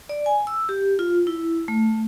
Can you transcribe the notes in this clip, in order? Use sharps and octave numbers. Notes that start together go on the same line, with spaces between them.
D5
G#5
E6
G4
F4
E4
A3